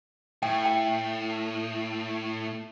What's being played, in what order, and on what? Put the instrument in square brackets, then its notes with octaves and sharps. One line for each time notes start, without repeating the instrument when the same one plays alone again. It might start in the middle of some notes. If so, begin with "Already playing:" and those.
[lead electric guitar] A2 [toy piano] G5
[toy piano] G5